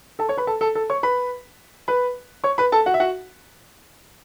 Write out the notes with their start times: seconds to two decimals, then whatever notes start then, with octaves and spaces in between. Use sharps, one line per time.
0.19 A4 A5
0.29 C#5 C#6
0.37 B4 B5
0.47 A4 A5
0.61 A4 A5
0.75 A4 A5
0.90 C#5 C#6
1.03 B4 B5
1.88 B4 B5
2.44 C#5 C#6
2.58 B4 B5
2.72 A4 A5
2.86 F#4 F#5
2.94 E5
3.00 F#4 F#5